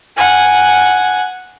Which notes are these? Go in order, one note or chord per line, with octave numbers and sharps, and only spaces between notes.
F#5 G#5